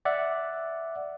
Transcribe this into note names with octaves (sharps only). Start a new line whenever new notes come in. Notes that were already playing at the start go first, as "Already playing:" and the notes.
D5 E5 F#5